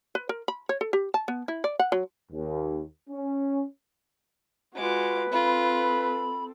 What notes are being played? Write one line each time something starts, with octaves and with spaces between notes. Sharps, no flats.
B4
A#4
B5
C#5
A4
G4
A5
B3
E4
D5
F#5
F#3
D#2
C#4
G#3 F4 F#4 B4 D6
C4 F4 A4 B5